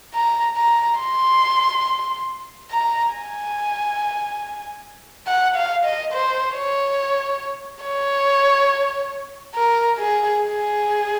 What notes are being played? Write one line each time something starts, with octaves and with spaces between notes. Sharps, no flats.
A#5
A#5
C6
A#5
G#5
F#5
F5
D#5
C5
C#5
C#5
A#4
G#4
G#4